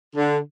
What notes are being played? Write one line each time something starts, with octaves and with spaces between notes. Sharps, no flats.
D3